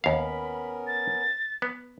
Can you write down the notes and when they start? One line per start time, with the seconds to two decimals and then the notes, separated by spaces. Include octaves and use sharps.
0.04 D#2 B3 C#4 A#4 F5 B5
0.87 A6
1.62 B3